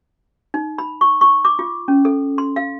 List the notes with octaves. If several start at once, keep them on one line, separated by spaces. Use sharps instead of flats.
D#4
B5
C#6
C#6
D6
F4
C#4
A4
C6
F5